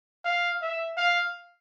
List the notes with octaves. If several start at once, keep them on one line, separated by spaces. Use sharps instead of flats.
F5
E5
F5